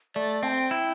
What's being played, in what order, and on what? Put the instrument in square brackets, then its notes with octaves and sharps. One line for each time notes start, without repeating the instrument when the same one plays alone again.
[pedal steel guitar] A3 [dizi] D5
[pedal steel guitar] C4 [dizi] A5
[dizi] G5
[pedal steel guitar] E4